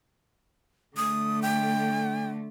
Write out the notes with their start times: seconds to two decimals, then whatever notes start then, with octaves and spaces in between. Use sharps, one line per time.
0.97 D3 A3 D#6
1.42 G5